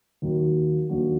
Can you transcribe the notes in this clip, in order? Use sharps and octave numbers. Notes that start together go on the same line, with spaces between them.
D#2 D#3 F#3
D#2 D#3 A#3 D4 F#4